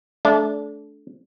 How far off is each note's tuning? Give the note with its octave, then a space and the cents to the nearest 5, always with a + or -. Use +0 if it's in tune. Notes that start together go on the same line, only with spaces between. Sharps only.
A3 -25 D4 -20